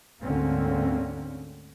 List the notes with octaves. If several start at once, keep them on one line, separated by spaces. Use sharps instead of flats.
D2 G#2 D3 A#3 C4 C#4